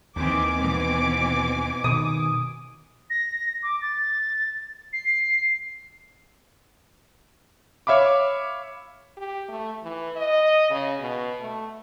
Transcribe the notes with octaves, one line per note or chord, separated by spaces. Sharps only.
D#2 D#3 E3 C4 G#5 D6
B2 E3 C4
B2 D#3 D#6
A#6
D6
A6
C7
C#5 E5 F5 B5 D6
G4
A3
E3
D#5
C#3
B2
A3